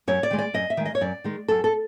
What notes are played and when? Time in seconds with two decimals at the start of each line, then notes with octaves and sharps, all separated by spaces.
0.08 F#2 C#5
0.23 D5
0.31 D#3 G#3
0.39 D5
0.54 F#2 D#5
0.70 E5
0.77 D#3 G#3
0.86 D#5
0.95 C#5
1.01 F#2 D5
1.24 D#3 G#3
1.48 F#2 A4
1.64 A4